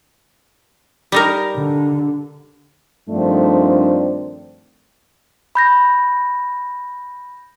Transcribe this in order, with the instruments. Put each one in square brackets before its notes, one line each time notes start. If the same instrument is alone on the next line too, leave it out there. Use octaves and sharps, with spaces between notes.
[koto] G3 D#4 A#4
[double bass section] D3
[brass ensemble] G2 D#3 F3 A3 C4 D4
[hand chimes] B5 G6 A#6